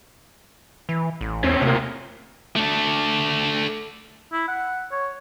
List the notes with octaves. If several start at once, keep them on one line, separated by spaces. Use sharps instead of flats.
E3
A1
E2 C4 C#4
A2 C3 A#3
A3 D4
E4
F#5
C#5